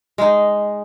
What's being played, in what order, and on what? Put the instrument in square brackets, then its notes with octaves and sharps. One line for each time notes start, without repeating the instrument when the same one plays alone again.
[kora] G#3 D#4